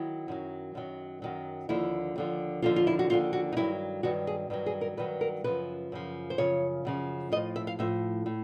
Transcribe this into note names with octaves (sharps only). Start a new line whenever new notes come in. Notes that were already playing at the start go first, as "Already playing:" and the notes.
Already playing: D#3 F#3 E4
F#2 D#3 F#3
F#2 D#3 F#3
F#2 D#3 F#3
D#2 D3 F3 E4
D#2 D3 F3
D#2 D3 F3 F4
F4
E4
F#4
D#2 D3 F3 F4
F#4
D#4
G2 D#3 F#3 E4
G2 D#3 F#3 F#4
G#4
G2 D#3 F#3
G#4
A#4
G2 D#3 F#3 B4
A#4
F#2 C#3 F3 B4
F#2 C#3 F3
C5
F#2 C#3 F3 C#5
F#2 C#3 F3
A2 F3 D#5
E5
F5
A2 F3 E5
A2